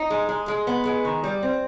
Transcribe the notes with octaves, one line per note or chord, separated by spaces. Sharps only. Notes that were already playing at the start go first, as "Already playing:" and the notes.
Already playing: D#4
G#3
G#3
G#3
B3
G#3
D#3
G3
C4